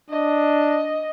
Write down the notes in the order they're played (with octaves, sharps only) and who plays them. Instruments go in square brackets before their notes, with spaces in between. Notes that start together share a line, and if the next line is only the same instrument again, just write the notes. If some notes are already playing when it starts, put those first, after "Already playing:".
[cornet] D4 [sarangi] D#5